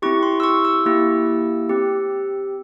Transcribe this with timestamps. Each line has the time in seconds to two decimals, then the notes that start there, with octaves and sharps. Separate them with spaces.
0.02 C4 E4 G4 C#6
0.23 C6
0.40 E6
0.43 C#6
0.65 E6
0.86 A#3 E4 G4
1.69 C4 G4